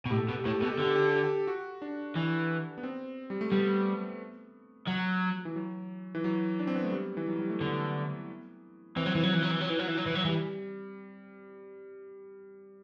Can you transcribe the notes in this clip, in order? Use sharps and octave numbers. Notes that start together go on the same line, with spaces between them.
B2
A2 G4
A4
G4
B2
A4
G4
A2 A4
G4
B2 A4
G4
A4
D3 G4
A4
G4
A4
G4
A4
G4
F#4
D4
E3
B3
C4
G3
A3
G3 B3
F#3
E3
F#3
E3
F#3
D4
C4
B3
A3
G3
E3
F#3
G3
A3
D3 B3
E3 C4
F#3
E3
F#3
E3
F#3
E3
F#3
E3
F#3
E3
F#3
E3
F#3
E3 G3